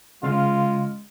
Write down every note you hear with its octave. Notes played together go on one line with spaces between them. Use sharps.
C#3 G#3 F4 F5 F6